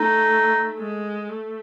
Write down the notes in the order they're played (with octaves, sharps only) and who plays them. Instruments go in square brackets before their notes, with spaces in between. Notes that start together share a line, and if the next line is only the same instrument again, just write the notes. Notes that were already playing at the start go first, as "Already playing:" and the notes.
Already playing: [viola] A3 [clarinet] D#4
[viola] G#3
A3